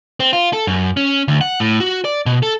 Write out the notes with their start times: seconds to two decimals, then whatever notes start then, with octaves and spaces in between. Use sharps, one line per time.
0.20 C4
0.33 F4
0.53 A4
0.67 F#2
0.97 C#4
1.28 D2
1.41 F#5
1.60 A2
1.80 F#4
2.05 D5
2.26 B2
2.43 A4